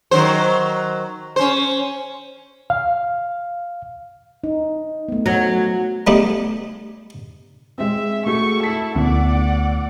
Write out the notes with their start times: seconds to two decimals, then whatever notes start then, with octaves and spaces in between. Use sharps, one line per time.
0.11 D#3 F#3 C5
1.36 C#4 C5
2.70 F5
4.44 D#4
5.09 A3 B3
5.26 F#3
6.07 G3 A3 B3 D4 D#4 G4
7.78 G#3 C4 E5
8.26 A3 F#4 G#4 C#6
8.63 E4 A4 B6
8.96 D2 A2 B3 D5 F#5